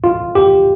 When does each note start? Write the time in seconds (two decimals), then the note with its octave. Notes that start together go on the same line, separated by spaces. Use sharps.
0.04 F4
0.35 G4